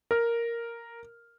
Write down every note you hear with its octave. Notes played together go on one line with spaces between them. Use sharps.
A#4 F6